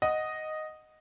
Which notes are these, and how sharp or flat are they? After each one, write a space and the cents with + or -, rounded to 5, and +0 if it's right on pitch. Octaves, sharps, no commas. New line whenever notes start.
D#5 +0 F#5 +0